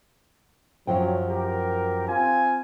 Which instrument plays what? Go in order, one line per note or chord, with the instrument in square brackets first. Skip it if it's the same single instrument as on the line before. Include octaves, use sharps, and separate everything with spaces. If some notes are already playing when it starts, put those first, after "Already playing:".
[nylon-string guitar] F#2 F3 G5 [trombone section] F#3
[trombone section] G4 A#4
[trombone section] C4 F4 [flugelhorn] G#5